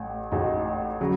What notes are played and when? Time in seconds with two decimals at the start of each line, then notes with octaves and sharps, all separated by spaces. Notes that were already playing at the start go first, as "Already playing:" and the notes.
Already playing: A1 A2
0.32 A1 A2 G#3 D#4
1.01 C#3 F#3